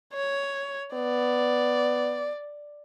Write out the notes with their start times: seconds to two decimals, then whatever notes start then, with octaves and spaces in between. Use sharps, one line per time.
0.13 C#5
0.94 B3 D5